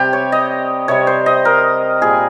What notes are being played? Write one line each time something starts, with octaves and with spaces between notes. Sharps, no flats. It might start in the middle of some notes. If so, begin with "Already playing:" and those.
Already playing: C3 G3 G4
C#5
D#5
C3 G3 C#5
C5
D#5
A#4
A#2 G3 G#4